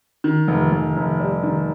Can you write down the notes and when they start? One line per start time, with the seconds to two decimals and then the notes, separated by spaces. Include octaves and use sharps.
0.24 D#3
0.48 F1
0.72 F1
0.97 F1
1.20 G3
1.43 D#3